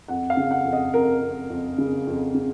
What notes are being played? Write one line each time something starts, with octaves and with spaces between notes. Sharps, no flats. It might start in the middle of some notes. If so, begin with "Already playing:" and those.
F2 F#5
F5
C#3
F#5
F2
D#5
F2 A#4
F2
F2
C#3
F2
C#3